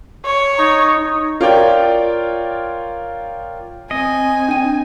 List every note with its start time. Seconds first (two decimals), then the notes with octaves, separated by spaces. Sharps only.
0.25 C#5
0.58 D#4
1.41 F4 A#4 C#5 D5 G5
3.91 C4 D#5 G#5
4.48 D4 G5 D#7